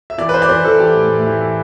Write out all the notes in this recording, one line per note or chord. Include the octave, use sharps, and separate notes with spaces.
E5
E3 D5
B4
E3 C5
D5
E3 C5
E3 A4
E3 G4
A2
A2
E3
E3